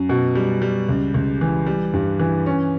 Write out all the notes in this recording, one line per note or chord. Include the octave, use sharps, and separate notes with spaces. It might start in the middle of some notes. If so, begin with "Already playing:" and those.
Already playing: F#2
B2
G3
G3
C#2
C#2
E3
G3
G2
E3
C#4